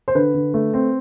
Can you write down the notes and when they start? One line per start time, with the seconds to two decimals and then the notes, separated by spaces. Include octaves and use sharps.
0.08 C5
0.15 D3 B4
0.34 D3
0.54 A3
0.74 C4